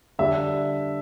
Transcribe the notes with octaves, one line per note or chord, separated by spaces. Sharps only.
D3 G3 D4 E5